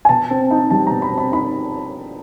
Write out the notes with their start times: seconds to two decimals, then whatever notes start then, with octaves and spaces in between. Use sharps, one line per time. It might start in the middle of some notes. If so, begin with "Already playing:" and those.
0.05 G#5
0.09 B2 A5
0.31 C4
0.51 D#4
0.70 G3 A5
0.87 B2 A#5
1.02 B5
1.11 C4
1.18 B5
1.32 D#4 B5